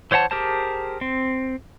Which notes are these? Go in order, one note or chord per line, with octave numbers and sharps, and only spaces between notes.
E3 C5 C#5 F#5 A5
G4 G#4 A#4 C5 A5
C4